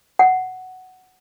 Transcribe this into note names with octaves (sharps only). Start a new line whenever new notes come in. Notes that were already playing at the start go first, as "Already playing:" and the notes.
F#5